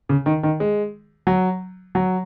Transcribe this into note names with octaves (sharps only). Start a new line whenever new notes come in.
C#3
D#3
D#3
G#3
F#3
F#3